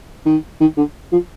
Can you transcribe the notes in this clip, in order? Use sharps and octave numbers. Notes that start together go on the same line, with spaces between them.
D#3
D#3
D3
F3